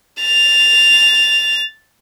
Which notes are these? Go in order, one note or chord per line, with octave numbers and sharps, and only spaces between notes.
A6 F7